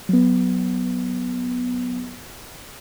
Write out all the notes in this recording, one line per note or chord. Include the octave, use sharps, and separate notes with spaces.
F#3 B3